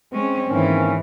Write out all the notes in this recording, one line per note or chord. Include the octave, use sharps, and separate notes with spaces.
G#3 C4 C#4
G#2 D#3 E3 A#3 C#4